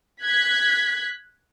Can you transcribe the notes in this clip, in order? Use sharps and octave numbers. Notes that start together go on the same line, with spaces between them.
F#6 G#6 B6